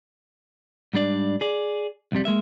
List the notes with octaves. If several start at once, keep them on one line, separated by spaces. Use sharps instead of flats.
G#2 G3 D4 D5
G#4 D5
C2 F2 C3 G3
G#3 A#3 E5